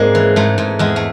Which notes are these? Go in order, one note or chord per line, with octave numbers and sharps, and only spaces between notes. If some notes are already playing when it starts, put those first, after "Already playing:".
Already playing: G#2 G#3 A#3 C4 D4
E3
G#2 A3
G#2
E2 G#3
A3